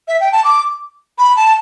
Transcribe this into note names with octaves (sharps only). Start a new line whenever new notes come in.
E5
G5
A5
D6
B5
A5